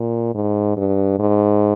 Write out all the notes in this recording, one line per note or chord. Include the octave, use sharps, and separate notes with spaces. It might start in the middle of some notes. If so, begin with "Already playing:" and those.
Already playing: A#2
G#2
G2
G#2